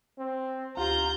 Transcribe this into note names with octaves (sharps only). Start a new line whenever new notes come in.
C4
D2 F4 G4 A#5 G6